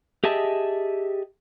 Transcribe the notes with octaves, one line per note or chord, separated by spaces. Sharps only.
G4 G#4 D#5 E5 A5